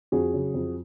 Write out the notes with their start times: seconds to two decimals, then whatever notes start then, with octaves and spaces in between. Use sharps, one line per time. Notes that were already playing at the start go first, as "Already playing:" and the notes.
0.12 F2 F#4 G#4
0.34 C#3 F#3
0.54 F2